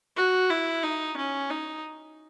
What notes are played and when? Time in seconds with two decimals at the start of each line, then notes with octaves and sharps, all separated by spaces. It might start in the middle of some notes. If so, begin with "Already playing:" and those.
0.16 F#4
0.50 E4
0.83 D#4
1.17 C#4
1.50 D#4